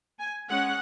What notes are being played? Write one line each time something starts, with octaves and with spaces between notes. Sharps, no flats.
G#5
G#3 C#4 F#5